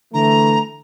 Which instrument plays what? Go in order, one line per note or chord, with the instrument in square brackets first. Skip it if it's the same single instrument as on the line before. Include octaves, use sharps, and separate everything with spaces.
[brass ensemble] D3 E3 A3 [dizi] A#5